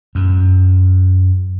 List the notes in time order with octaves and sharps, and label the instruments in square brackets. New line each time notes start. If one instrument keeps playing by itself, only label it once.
[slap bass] F#2